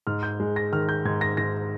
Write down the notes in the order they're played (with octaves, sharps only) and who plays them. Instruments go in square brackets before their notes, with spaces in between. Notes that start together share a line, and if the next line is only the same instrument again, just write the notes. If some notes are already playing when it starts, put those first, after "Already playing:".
[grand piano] G#2 F6
G6
G#3
A#6
D#3 F6
G6
G#2 G#6
A#6
G#2 A#6